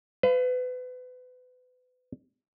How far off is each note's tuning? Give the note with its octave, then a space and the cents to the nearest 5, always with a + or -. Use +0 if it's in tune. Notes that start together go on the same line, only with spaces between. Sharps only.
B4 +30 F5 -15